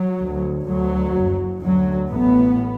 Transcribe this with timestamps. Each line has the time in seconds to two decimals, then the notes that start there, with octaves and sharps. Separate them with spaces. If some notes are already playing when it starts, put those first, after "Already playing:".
Already playing: F#3
0.19 D2
0.66 D2 F#3
1.14 F#1 F#2
1.61 D2 F#3
2.09 A1 A2 B3